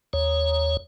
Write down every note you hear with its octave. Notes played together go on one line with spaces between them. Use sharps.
D#2 C#5